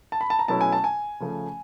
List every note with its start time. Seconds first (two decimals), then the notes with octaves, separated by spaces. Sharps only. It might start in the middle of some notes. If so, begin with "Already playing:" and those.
0.12 A5
0.21 B5
0.30 A5
0.39 A#5
0.48 B2 F#3 A3 C#4 E4 A5
0.61 G#5
0.73 A5
0.84 G#5
1.20 C#3 F3 A3